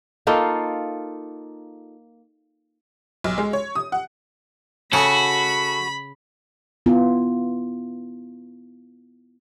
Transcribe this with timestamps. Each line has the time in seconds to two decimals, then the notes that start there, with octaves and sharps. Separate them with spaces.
0.27 A#3 D#4 F4 A4
3.24 B1
3.38 G#3
3.53 C#5
3.75 D#6
3.92 F#5
4.93 C#3 F#4 A4 G#5 B5
6.86 B3 E4 F4